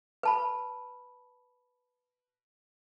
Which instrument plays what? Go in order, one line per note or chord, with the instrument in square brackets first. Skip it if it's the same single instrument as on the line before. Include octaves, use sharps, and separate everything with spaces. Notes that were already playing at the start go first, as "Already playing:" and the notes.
[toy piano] B4 A5 B5